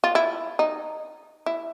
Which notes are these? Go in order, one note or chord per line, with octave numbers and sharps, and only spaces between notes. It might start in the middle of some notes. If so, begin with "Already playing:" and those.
F4
E4
D#4
E4